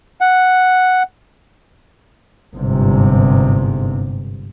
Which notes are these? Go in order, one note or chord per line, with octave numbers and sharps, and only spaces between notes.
F#5
G1 G#2 C3